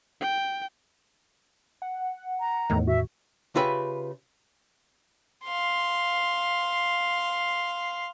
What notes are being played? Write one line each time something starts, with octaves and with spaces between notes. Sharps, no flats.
G5
F#5
A#5
E2 A2 D#3
F#4 E5
C#3 F4 G4 B4 E5 B5
F5 C6